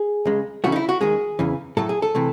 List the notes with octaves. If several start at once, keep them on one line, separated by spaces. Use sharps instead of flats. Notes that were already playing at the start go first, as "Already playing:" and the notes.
Already playing: G#4
C#2 C#3 G#3
C#2 C#3 E3 A3 F#4
D#4
E4
F#4
D#2 D#3 G#3 G#4
E2 C#3 E3
A2 F#3 A3 A4
G#4
A4
C3 E3 A3